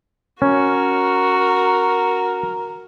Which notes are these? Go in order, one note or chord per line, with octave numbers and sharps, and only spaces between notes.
C#4 F#4 A#4